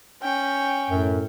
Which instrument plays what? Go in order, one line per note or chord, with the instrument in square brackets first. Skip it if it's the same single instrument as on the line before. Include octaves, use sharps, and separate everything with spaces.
[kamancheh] C#4 [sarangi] G5
[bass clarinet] F#2 [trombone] A2